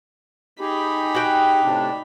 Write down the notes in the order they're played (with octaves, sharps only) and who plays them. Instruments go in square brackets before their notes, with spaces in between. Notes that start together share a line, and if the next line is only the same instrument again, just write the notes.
[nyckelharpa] D#4 B5 [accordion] G4 G#4
[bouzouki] F#4 G5
[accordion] A2 C3 D4